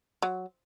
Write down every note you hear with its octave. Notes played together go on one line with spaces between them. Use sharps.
F#3